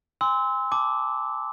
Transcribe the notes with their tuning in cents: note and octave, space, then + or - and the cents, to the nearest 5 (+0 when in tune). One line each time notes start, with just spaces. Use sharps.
G#5 -40 C6 -15 E6 -25
A5 -5 D6 +0